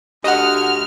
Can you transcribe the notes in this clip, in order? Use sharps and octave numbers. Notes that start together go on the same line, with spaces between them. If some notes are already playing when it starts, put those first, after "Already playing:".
D2 G4 D#5 F#5 D#6 F6